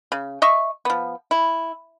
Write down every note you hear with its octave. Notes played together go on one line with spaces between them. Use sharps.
C#3
D#5 E5 C#6
F3 B3
E4